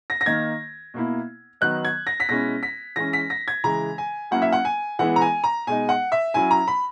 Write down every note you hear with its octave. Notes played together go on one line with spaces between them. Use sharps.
A#6
A#6
D#3 A#3 D#4 G#6
B2 A#3 E4
D#3 F#3 B3 D#4 F#6
G#6
A#6
B6
B2 G#3 C#4 E4 A#6
B6
E3 G#3 C#4 A#6
B6
A#6
G#6
C#3 E3 G#3 A#5
G#5
F#3 A#3 C#4 E4 F#5
E5
F#5
G#5
E3 G#3 B3 E4 F#5
A#5
G#5
A#5
B2 G#3 D#4 G#5
F#5
E5
F#3 C#4 E4 G#5
A#5
B5